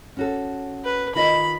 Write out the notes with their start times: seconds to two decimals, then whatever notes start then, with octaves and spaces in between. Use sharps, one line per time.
0.17 C#4 F#4 A4
0.84 B4
1.15 D#3 F4 D#5 B5